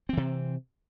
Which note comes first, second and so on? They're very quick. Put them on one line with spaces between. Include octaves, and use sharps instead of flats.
C4 E3 C3